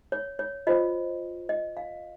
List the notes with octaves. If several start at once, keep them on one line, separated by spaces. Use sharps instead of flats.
C#5
C#5
F4 C5 D#5
D#5
F5